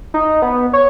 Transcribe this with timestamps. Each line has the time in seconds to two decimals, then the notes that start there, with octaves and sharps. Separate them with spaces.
0.14 D#4
0.42 B3
0.73 C#5